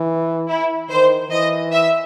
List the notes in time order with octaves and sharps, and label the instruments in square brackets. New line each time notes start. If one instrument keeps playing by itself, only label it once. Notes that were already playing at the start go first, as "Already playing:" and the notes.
Already playing: [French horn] E3
[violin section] E4
[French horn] D#3 [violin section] C5
[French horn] E3 [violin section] D#5
[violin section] E5